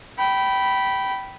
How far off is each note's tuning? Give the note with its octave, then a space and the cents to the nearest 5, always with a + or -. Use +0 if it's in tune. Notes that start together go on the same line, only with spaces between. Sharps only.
G5 -20 B5 -5